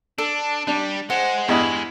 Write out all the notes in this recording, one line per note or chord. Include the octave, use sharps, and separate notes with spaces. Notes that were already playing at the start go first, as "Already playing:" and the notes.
D4 A4
G3 D4
G#3 C5 F#5
E2 G2 E4 D#5